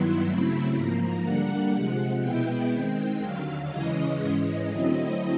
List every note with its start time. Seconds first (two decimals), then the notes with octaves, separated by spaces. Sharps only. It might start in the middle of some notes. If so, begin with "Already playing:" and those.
Already playing: G2 D#3 F#3 B3 E4 C6
0.25 C#3 F#3 A3 C4 E4 B5
0.74 G#2 F3 A#3 A#5
1.23 D3 G3 A#3 D4 F#5
1.72 C3 F3 G#3 F#5
2.22 B2 G#3 B3 E4 G5
2.72 D#3 G#3 C4
3.20 D#2 D3 F#3 F5
3.70 E2 C#3 E3 G#3 C#4 D#5
4.19 G#2 E3 G#3 C#4 D#5
4.69 D3 F#3 A3 C4 E4